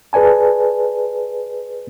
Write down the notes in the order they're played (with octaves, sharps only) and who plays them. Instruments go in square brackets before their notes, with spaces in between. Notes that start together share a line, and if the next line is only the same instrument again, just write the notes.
[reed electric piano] G#4 B4 D5 G#5 A5